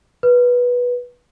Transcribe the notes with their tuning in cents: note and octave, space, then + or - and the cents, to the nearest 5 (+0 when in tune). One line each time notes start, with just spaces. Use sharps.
B4 -15